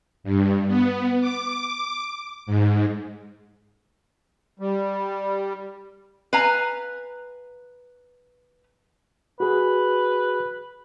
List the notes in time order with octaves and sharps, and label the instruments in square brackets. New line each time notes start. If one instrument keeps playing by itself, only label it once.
[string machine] G2
B3
D6
G#2
[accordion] G3
[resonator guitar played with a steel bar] B4 F5 G#5 A#5
[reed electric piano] F#4 G#4 [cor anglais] B4